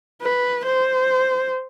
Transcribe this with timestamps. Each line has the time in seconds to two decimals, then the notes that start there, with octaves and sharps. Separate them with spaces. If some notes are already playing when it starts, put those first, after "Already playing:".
0.21 B4
0.66 C5